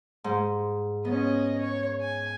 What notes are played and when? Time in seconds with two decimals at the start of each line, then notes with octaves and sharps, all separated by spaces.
0.24 G#2
1.05 B3 C#4 D#5
1.58 C#5
2.01 G#5